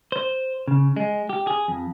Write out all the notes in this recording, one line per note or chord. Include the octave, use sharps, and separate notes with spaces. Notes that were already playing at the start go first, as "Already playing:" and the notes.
C5
C#3
G#3
G4
G#4
F2